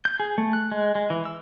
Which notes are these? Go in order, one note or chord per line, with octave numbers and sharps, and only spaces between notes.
G6
G#4
A3
F#6
G#3
G#3
E3
E6